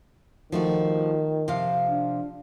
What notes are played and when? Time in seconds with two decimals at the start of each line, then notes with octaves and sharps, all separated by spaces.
0.52 D#3 F3 A3 F#4
1.48 C3 F3 F5
1.89 D4